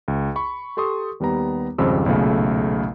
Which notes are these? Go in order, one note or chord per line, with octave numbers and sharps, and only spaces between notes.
C#2
B5 C#6
G4 A4 C6 C#6 D#6
D#2 G3 B3 A#5
G#1 F2 C#3 G3 C5 E6
B1 E2 A#2 C#3 A3